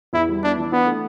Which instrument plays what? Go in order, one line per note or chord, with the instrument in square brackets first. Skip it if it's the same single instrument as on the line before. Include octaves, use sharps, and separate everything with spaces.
[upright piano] E2 [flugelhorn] E4
[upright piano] G3
[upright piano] B3 [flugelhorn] D4
[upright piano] E3
[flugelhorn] B3 [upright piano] D4
[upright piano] A3